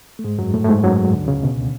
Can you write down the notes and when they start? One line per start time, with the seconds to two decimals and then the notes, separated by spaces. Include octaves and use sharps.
0.19 A3
0.24 G#2 G#3
0.38 F#2 F#3
0.54 A2 A3
0.64 A3
0.69 G#2 G#3
0.83 F#2 F#3
1.12 D2 D3
1.28 C#2 C#3
1.43 B2